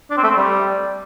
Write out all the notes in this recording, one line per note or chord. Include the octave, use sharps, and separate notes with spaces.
D4
C4
A3
C4
G3